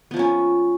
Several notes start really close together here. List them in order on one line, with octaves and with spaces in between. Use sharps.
B3 F3 A#3 C#4